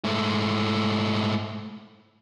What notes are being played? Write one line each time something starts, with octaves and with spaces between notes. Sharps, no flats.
G#2 A3